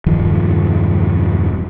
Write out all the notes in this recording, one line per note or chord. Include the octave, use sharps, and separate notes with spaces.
E1 G2 D#3 F3